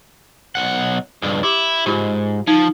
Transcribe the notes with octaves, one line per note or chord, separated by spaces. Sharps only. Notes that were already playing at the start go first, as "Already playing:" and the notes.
B1 F#5
C#2 G2
E4 G4 D6
G#2 F4 G4
F3 D#4